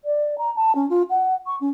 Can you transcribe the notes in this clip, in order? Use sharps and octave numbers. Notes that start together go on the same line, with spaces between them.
D5
A#5
A5
C#4
F4
F#5
C#6
C#4